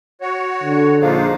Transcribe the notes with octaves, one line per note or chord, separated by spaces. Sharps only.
F#4 C#5
D3
A#1 D4 D#4 F4 G#4 C5 F5